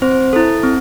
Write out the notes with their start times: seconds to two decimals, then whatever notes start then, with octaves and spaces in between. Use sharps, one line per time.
0.02 C4 C5
0.33 E4 A4
0.63 C4